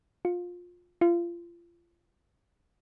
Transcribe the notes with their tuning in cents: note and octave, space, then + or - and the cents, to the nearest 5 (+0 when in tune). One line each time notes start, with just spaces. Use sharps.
F4 +20
F4 -30